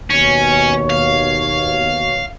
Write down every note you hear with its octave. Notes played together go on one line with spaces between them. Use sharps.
D#2 B2 C#4 C#5
F5